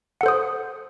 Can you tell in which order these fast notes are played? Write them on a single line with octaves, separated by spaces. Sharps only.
F#5 A4 C5 D#6